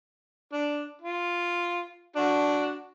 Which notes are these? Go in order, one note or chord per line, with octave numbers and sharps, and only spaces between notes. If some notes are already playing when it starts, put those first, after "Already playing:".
D4
F4
D4 F#4